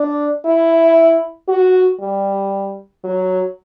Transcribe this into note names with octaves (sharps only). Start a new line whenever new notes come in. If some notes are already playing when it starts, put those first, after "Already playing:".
Already playing: D4
E4
F#4
G3
F#3